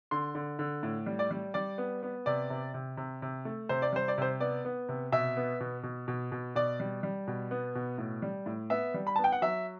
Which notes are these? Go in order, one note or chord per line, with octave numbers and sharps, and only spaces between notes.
D3 C6
D3
D3
A2
G3
D5
G3
G3 D5
B3
B3
C3 D5
C3
C3
C3
C3
A3
C3 C5
D5
G3 C5
D5
C3 C5
B3 D5
B3
C3
B2 E5
B3
B2
B2
B2
B2
B2 D5
G3
G3
B2
B3
B2
A2
G3
A2
B3 E5
G3
B5
B3 A5
G5
F#5
F#3 E5